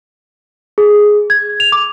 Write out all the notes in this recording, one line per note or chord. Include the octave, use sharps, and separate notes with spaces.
G#4
G#6
F7
D6